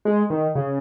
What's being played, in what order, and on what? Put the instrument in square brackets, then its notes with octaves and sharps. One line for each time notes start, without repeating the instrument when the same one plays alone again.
[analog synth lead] G#3
D#3
C#3